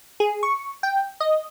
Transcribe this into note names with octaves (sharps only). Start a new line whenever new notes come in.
G#4
C#6
G5
D#5